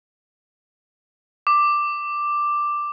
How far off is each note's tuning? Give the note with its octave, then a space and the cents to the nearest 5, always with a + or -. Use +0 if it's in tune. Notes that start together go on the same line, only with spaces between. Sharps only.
D6 +5